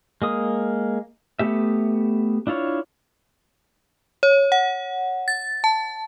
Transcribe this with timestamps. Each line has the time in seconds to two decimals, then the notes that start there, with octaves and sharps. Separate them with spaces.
0.22 G#3 A#3 D#6
1.39 A3 B3 G4 E5
2.47 D4 E4 F4 C#5
4.23 C#5
4.52 F#5
5.28 A6
5.64 A5